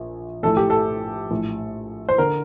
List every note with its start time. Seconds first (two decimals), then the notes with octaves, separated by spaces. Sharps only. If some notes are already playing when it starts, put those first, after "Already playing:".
Already playing: A#1 A#2
0.43 A#1 A2 A4
0.57 G4
0.70 A4
1.31 A#1 A2
2.09 C5
2.18 D3 A#4